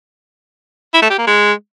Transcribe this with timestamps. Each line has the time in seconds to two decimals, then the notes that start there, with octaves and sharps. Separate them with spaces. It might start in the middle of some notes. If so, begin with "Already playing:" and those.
0.94 E4
1.02 A3
1.10 G4
1.19 A#3
1.27 G#3